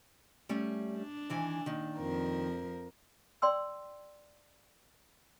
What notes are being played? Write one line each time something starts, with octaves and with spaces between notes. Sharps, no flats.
G3 A3 C#4
D4
D#3 E3 G#5
A#2 D#3
F2 F3 A#4
D5 G5 C6 E6